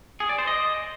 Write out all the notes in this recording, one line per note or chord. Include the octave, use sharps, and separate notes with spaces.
G#4
D5
C5
D#5